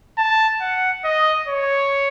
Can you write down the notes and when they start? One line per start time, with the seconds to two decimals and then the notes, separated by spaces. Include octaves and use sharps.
0.18 A5
0.61 F#5
1.04 D#5
1.47 C#5